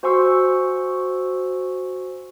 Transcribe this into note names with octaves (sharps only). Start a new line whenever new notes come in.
F#4 C5 G#5 C6 C#6 E6